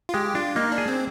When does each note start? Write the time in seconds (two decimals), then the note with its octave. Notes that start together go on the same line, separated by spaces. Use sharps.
0.09 F4
0.14 G#3 G4
0.35 D4 F4
0.56 A#3 D#4
0.72 D4
0.78 G#4
0.88 C4